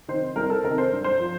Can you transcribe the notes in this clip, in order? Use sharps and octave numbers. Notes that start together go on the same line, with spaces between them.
C3 D#3 C5
C2 A#4
A4
C3 D#3 A#4
C5
G2
C5
F3